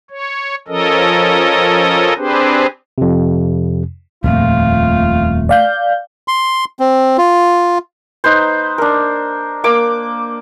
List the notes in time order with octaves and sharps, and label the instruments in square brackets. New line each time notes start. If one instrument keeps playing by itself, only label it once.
[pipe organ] C#5
F3 C#4 A4 A#4 D#5
C4 D4 G4 G#4 B4 C5
[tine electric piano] F2 C3
[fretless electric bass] D#1 F2 A#2 [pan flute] A3 [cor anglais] F4
[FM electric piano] D5 F5 G6
[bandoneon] C6
C4
F4
[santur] D#4 B4 C5
D4 A#4
A#3 D6